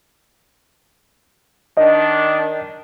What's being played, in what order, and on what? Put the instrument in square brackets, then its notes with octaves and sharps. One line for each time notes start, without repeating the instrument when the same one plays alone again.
[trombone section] D#3 D4 [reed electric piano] D#5